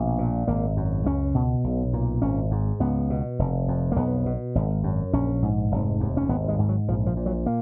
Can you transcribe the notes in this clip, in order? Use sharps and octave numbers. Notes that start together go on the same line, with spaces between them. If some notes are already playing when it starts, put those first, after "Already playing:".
Already playing: A#1 B2
A#2
G#1 A#3
F#2
C#2 C#4
B2
B1
A#2
G#1 C#4
G#2
C#2 B3
B2
F1
F2
A#3
B1 B3
B2
G#1
F#2
A#1 C#4
G#2
F1
D#2
C#4
G#1 B3
G#3
G#2
F#3
A#1 F3
F3
A#2
F#3
A#3